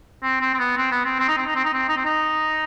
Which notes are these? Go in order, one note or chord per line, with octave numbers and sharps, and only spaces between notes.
C4
C4
C4
B3
C4
B3
C4
C4
D#4
C4
D#4
C4
D#4
C4
D#4
C4
D#4